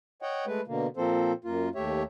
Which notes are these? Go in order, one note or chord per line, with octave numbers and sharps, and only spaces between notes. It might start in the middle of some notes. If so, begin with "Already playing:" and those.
C#5 D#5 F#5 G5
G#3 A3 B4
B2 D3 A#3
A#2 F3 A#3 C4 A4 C5
F#2 A#3 F4
D#2 A3 G4 C#5 E5